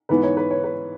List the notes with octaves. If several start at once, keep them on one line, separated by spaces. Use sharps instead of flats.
G#2 E3 B3 B4
C#5
B4
C#5
B4